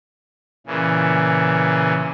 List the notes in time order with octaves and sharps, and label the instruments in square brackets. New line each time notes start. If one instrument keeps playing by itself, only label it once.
[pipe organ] A#2 C#3 E3